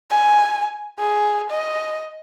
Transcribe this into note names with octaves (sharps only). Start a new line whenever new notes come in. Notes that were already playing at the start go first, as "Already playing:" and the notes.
G#5
G#4
D#5